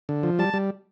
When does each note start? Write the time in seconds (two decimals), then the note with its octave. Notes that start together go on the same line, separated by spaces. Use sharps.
0.09 D3
0.23 F3
0.39 G3 A5
0.54 G3